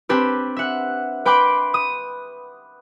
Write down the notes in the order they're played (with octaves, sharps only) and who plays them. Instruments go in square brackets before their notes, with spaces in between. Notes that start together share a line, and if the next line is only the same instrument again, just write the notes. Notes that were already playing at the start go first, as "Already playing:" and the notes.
[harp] C4 D4 G4 B4
E5 F#5
B4 G5 B5 C6 D6
D#6